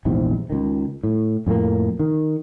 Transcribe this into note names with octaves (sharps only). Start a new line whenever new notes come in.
A#1 E2 G#2 C3
C#2 D#3
A2
F2 A2 A3 A#3
D#3